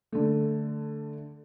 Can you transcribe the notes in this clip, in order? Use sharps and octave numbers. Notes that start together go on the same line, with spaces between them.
D3 A3